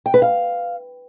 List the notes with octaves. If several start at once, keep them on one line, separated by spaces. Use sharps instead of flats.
G5
B4
F5